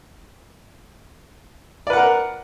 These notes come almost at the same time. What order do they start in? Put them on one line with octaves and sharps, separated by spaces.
D5 B4 F#5 A#4